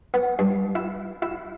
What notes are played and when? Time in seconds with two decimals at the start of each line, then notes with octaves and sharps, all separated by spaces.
0.14 B3
0.39 G2
0.75 E4
1.22 E4